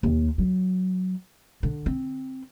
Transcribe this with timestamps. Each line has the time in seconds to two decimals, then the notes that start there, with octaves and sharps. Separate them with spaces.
0.03 D#2
0.38 F#3
1.63 D3
1.86 C4